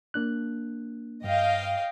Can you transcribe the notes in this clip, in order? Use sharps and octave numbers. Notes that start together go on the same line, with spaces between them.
A#3 D4 F#6
G2 D#5 F5 G5